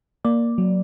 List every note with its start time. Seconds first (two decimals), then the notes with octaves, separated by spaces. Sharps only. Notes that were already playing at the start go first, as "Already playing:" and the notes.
0.25 A#3 D5
0.58 F#3